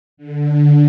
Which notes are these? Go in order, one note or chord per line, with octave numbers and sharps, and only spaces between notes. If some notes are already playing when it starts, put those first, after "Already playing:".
D3